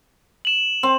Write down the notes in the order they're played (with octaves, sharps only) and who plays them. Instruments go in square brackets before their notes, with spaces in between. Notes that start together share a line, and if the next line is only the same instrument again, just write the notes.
[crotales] E7 F#7
[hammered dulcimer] C4